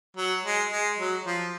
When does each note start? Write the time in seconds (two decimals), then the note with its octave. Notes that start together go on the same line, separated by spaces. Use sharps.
0.17 F#3
0.44 G#3
0.71 G#3
0.98 F#3
1.25 F3